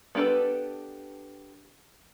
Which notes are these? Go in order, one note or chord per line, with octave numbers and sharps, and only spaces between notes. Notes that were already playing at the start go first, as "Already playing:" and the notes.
B3 D4 G4 A4 B4